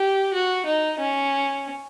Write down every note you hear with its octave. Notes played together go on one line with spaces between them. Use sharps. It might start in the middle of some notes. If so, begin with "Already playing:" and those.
Already playing: G4
F#4
D#4
C#4